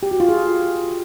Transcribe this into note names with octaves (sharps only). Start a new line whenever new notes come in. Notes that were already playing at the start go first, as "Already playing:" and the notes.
G4
F#4
F4
G#4